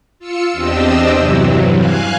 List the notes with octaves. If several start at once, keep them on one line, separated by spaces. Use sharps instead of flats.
F4 E6 C#7
E2 C4 D4 G4 D#5 E6
G2 C3 E3 F#3
F5 G#5 F#6